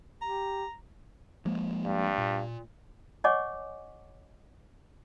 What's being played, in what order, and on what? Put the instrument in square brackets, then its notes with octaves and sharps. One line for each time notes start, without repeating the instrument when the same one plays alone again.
[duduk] G4 [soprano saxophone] A#5
[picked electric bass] F3 G#3 A#3
[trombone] G2
[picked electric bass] A#2
[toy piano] C#5 D#5 F#5 G#5 C#6 D6